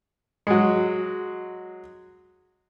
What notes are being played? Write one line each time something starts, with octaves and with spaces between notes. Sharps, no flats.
F#3 G#3